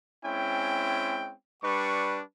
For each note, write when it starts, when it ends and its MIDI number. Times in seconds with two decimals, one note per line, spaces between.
0.24 1.33 56
0.24 1.33 60
0.24 1.33 61
0.24 1.33 64
0.24 1.33 79
1.63 2.21 55
1.63 2.21 62
1.63 2.21 71
1.63 2.21 85